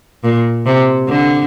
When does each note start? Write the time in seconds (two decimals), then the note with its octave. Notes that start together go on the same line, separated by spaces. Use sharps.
0.24 A#2
0.66 C3
1.08 D3